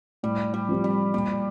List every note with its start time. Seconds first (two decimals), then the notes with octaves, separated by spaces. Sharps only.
0.23 A2 G3
0.54 G3
0.69 F3 C4 G4
0.84 G3
1.14 A#2 G3